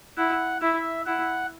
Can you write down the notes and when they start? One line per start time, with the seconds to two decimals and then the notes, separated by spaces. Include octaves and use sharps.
0.17 E4 F#5
0.61 E4 E5
1.06 E4 F#5